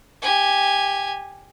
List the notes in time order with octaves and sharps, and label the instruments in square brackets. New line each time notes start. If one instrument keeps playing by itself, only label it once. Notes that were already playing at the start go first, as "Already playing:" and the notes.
[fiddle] G4 G#5